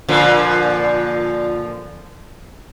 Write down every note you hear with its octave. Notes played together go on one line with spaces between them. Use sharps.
A#2 D3 F3